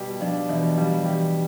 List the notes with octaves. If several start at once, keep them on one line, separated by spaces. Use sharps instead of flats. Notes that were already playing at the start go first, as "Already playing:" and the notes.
Already playing: B2 G3 G4
F3 D4
B2 E3
F3 G3
E3 G4